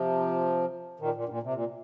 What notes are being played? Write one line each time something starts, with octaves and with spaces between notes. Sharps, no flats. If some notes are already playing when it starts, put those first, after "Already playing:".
Already playing: C3 F3
A#2 D#3
A#2
G2
A#2
C3
A#2